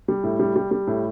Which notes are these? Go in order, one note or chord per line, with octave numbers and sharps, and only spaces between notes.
G3
A2
G3
G3
G3
A2